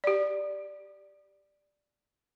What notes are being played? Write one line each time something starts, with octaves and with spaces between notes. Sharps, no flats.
G4 D5